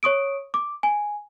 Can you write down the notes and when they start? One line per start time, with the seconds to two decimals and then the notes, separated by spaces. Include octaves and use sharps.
0.03 C#5 C#6 D#6 D7
0.54 D6
0.83 G#5